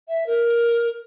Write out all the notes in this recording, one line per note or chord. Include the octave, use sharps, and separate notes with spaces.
E5
A#4